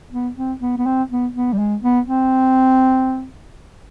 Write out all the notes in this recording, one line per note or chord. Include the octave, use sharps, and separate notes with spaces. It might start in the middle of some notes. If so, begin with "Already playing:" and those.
B3
C4
B3
B3
C4
B3
B3
G3
G#3
B3
C4